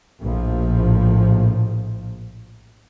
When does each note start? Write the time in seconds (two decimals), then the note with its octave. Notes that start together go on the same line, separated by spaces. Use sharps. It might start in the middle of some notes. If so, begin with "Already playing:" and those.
0.22 A#1 A2 F3